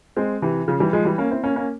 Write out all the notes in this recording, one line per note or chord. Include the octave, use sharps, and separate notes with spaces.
G#3 C4
C3 E3
C#3 F3
E3 G3
F3 G#3
E3 G3
A#3 C#4
C4 E4
A#3 C#4
A#3 C#4